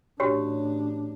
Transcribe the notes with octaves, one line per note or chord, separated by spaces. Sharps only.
A1 D4 F#4 G4 C#5